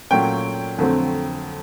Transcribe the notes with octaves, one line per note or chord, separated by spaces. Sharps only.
A#2 F#3 A3 C#4 G5
F2 D3 F#3 A3 C4